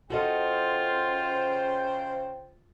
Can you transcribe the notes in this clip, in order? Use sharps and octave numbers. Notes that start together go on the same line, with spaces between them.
C#3 F4 F#4 A4 C5 D#5 G5